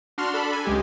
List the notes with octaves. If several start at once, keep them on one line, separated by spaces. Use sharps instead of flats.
D4 F#4 C6 F6
D4 A4 B5
G#5
C#2 G#3 G4